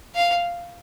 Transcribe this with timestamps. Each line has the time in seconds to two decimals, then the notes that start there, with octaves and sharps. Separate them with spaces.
0.15 F5